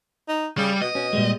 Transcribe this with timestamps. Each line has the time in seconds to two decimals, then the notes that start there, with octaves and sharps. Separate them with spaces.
0.28 D#4
0.58 C#3 G3
0.82 B2 D#5
0.95 B2 C#4
1.13 A#2 G3 G#3